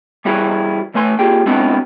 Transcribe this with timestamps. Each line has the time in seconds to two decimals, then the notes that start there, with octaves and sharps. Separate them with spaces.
0.25 E3 G3 E4 F#4 G#4
0.94 E3 A3 B4 G#5 C6
1.19 A#3 F4 G4 G#4 G5
1.46 G#3 B3 C4 D4 E4 F#4